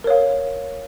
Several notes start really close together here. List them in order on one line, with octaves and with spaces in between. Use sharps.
A#4 C#5 F5